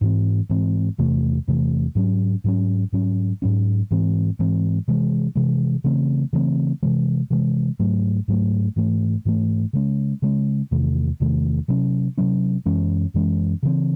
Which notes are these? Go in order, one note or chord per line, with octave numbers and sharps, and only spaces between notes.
G#2 E3 C4
G#2 E3 C4
E2 C3 E3 A3
E2 C3 E3 A3
G#2 F#3 C#4
G#2 F#3 C#4
G#2 F#3 C#4
G#2 F#3 C#4
G#2 E3 C4
G#2 E3 C4
C3 E3 G#3
C3 E3 G#3
C#3 E3 A3 C4
C#3 E3 A3 C4
C3 E3 G#3
C3 E3 G#3
G#2 F#3 A3
G#2 F#3 A3
G#2 E3 A3
G#2 E3 A3
C#3 G#3 C#4
C#3 G#3 C#4
E2 C3 D#3 A3
E2 C3 D#3 A3
C3 F#3 C#4
C3 F#3 C#4
F#2 E3 G#3 C#4
F#2 E3 G#3 C#4
C#3 E3 C4